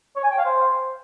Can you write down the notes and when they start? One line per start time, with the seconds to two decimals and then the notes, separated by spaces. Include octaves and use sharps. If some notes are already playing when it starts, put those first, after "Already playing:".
0.16 C#5
0.23 G#5
0.31 G5
0.38 F5
0.45 C5